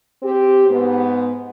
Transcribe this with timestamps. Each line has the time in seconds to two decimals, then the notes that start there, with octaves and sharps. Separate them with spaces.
0.23 C4 G4
0.68 G#2 B3